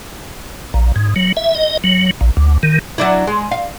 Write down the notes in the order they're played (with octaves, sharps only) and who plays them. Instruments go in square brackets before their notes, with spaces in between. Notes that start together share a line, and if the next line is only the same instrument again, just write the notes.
[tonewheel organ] A#1
G#2
F#3
E5
D#5
F#3
A#1
D2
D#3
[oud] F#3 D4 E4
G#3
F5